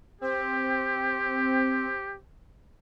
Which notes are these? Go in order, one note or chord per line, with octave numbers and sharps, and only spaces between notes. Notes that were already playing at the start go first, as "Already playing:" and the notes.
C4 G4